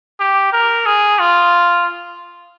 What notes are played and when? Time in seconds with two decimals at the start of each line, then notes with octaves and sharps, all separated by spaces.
0.20 G4
0.53 A#4
0.86 G#4
1.19 F4